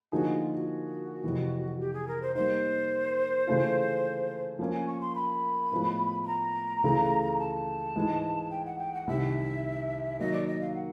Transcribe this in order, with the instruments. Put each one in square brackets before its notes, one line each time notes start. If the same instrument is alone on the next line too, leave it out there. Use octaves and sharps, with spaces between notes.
[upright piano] D3 F3 A#3 D#4 G#4 [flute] F#4
[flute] F4
F#4
[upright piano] F2 C3 E3
[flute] G4
G#4
A#4
C5
[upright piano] G3 A#3 D#4 [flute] C5
[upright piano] C#3 E3 A3 C#4 F4
F3 A#3 C#4
[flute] G#5
C#6
C6
B5
[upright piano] A2 F3 G#3 B3 E4
[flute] B5
A#5
[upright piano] C#2 C#3 E3 A3
[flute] A5
[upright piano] G#2 E3 G#3
[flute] G5
F#5
G5
F#5
[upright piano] C2 C3 D#3 [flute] E5
[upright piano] D#3 F#3 A#3 [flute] D#5
[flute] D5
D#5
F5
F#5